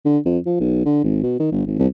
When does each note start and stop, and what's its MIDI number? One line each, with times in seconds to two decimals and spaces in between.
0.05 0.18 50
0.26 0.38 41
0.46 0.60 53
0.60 0.84 35
0.85 1.02 50
1.04 1.23 32
1.23 1.37 47
1.40 1.47 51
1.52 1.63 31
1.66 1.78 32
1.79 1.87 36